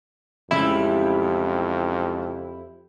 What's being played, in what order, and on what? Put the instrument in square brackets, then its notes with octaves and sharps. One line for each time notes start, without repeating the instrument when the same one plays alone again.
[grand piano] A1 C#3 G#3 [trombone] F2 [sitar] G3 [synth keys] E4